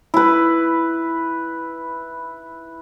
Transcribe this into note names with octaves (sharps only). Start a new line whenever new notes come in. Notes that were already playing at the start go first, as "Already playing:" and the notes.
E4 B4